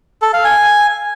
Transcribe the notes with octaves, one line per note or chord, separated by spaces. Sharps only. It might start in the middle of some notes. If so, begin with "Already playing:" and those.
A4
F5
G#5